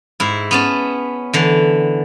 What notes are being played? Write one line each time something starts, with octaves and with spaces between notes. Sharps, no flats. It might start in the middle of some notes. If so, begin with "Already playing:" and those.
G#2 E4
B3 C#4 A5
D3 E3